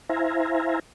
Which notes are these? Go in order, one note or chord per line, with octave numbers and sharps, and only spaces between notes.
E4 C5 E5 F5 G#5 A#5